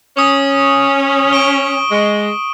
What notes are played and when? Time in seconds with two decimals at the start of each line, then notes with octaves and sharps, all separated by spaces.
0.17 C#4 C#6 D#6
1.33 C#6 D7 G7
1.91 G#3